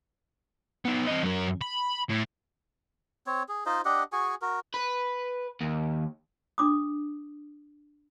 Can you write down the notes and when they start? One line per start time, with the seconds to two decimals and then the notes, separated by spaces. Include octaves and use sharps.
0.85 B3 D#4
1.07 C4 D#5
1.23 F#2 A#4
1.61 B5
2.09 A2
3.27 C4 C#5
3.49 G#4
3.66 D#4 F4 C5 D#5
3.85 D4 G4 D#5 F#5
4.12 F#4 G#4 G#5 C#6
4.42 F#4 A#4
4.74 B4
5.61 D#2
6.58 D4 D6 D#6